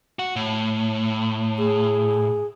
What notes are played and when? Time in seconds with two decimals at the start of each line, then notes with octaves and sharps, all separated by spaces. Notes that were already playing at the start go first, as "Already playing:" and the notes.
0.19 F#4
0.36 A2
1.58 G#4